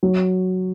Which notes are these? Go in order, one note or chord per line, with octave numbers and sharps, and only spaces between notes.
F#3